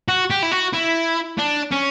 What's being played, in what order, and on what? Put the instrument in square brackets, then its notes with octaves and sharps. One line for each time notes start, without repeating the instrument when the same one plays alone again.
[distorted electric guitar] F#4
G4
E4
F#4
E4
D4
C#4